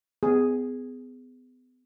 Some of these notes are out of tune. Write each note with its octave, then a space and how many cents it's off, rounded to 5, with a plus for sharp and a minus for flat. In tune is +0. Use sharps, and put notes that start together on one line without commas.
B3 +35 G#4 +0